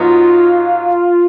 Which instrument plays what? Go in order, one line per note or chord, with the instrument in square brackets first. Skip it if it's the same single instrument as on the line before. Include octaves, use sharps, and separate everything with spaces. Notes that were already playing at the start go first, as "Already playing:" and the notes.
Already playing: [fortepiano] G#2 F#3 B3 D#4 [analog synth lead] F4